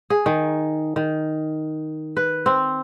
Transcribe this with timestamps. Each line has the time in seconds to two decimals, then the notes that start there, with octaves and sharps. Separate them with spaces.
0.10 G#4
0.26 D#3
0.96 D#3
2.17 B4
2.46 C4